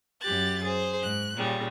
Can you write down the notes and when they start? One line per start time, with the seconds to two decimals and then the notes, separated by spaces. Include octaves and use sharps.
0.21 F#2 G4 F#6 A6
0.63 G#4 C5
1.01 G#2 F#6
1.36 A#2 C#3 G3